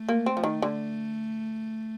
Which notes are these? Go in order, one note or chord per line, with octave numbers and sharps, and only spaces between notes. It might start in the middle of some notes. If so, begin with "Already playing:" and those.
Already playing: A3
A#3
C4
F3
D#3
D3